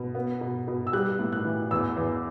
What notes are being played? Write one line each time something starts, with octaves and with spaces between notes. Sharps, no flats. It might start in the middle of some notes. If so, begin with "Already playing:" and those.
Already playing: B2
B3
B2
B2
E6
G3 F#6
A2
F#6
E3
E2 E6
E2